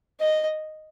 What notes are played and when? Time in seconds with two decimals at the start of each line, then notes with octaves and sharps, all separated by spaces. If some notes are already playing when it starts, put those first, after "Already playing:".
0.20 D#5